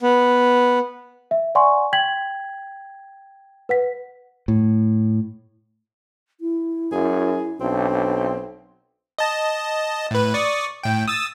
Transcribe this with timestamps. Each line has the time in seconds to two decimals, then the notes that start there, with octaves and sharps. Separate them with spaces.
0.01 B3
1.31 E5
1.55 D5 F#5 G#5 C6 C#6
1.93 G5 G#6 B6 F#7
3.69 B4 F#5 B6
4.48 A2
6.41 E4
6.92 F#2 G#4
7.61 B1 C4 D4
9.18 D#5 A5
10.11 A2 B4
10.34 D5 C#6 D#6
10.83 A2 G5
11.08 D#6 E6 A6